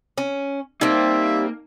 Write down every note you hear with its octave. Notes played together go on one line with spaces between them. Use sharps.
C#4
G3 A#3 C4 D#4 E5